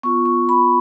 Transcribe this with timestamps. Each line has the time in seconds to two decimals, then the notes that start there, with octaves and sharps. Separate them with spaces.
0.03 B3 F4 C#6
0.25 C#6
0.49 B5